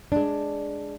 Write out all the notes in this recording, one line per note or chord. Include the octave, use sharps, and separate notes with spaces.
G#3 D4